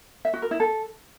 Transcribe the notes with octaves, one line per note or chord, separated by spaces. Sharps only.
E5
F#4
A#4
E4
A4